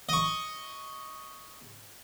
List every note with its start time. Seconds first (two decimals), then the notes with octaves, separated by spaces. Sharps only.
0.09 D#5 C#6